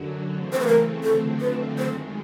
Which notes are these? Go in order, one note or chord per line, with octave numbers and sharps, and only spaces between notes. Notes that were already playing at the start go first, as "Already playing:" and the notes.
Already playing: F#2 D3 F#3
C#3 E3 A3 C4
C5
B4
A#4
F#2 D3 F3 A3 C4 A4
B4
F#2 D#3 G#3 C5